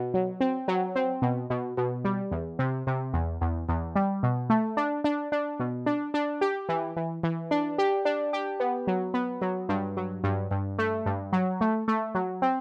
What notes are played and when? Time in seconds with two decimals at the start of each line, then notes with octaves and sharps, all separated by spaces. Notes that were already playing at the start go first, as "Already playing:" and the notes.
Already playing: B2
0.14 F#3
0.41 C4
0.68 F#3
0.95 C4
1.22 B2
1.50 B2
1.77 B2
2.04 G3
2.31 E2
2.59 C3
2.87 C3
3.13 E2
3.41 E2
3.69 E2
3.95 G3
4.23 B2
4.50 A3
4.77 D4
5.04 D4
5.32 D4
5.60 B2
5.86 D4
6.14 D4
6.41 G4
6.69 E3
6.97 E3
7.23 E3
7.51 D4
7.78 G4
8.05 D4
8.33 G4
8.60 B3
8.87 F#3
9.14 B3
9.42 F#3
9.69 G2
9.97 F#3
10.24 G2
10.51 G2
10.79 A3
11.06 G2
11.33 F#3
11.61 A3
11.88 A3
12.15 F#3
12.42 C4